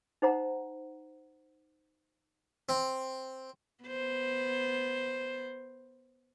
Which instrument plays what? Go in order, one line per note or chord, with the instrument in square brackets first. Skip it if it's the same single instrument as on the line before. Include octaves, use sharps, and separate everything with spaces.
[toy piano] D#4 C5 F#5 A#5
[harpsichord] C4
[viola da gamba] B3 C5